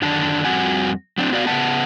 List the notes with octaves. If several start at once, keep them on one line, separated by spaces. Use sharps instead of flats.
F#2 D3 D#3 D4 A5
F2 G3 C4 F#4 F#5 G#5
F#3 C4 D4
B3 F#4 D5 F5
C#3 B3 B4 E5 F#5 A5